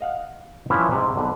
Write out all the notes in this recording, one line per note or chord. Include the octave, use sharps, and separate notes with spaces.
D#5 F5 F#5
E3 F3 G3 C#4 E4
G#2 C3
B1 D3 B4